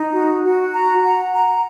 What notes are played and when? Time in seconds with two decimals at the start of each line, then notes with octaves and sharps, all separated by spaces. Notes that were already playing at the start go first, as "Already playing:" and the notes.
Already playing: D#4
0.13 F#4
0.43 F#4
0.73 A#5
1.03 F#5
1.33 A#5